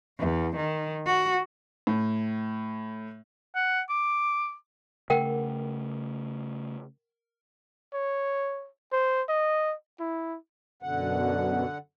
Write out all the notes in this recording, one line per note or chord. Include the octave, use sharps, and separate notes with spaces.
E2
D#3
F#4
A2
F#5
D6
C#3 A3 A#4 F#5 G5
C#5
C5
D#5
E4
F#2 B2 D3 F#5